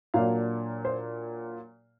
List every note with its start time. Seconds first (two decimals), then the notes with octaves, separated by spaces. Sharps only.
0.14 A#2 F#3 A#3 D4 F5
0.85 C5